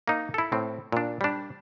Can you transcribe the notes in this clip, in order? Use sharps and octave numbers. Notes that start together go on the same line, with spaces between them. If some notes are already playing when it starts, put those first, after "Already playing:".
A#3 D#4
E4 A4
A2 C4
A#2 D4
G3 D4